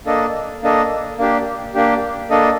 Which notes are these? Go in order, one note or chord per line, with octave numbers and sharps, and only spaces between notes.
A#3 D4 A4 D#5
A#3 D4 A4 D#5
A#3 D4 G4
A#3 D4 G4
A#3 D4 A4 D#5